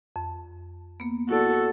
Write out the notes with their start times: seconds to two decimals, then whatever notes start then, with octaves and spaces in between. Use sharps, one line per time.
0.16 F2
1.00 A#3 B3
1.29 E4 F#4 A4 D5